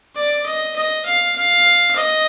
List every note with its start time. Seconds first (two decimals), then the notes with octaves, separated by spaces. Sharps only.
0.16 D5
0.46 D#5
0.76 D#5
1.06 F5
1.36 F5
1.96 D#5